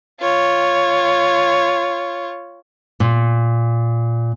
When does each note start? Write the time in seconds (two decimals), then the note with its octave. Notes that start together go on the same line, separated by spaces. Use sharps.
0.21 F4 C#5
3.00 A#2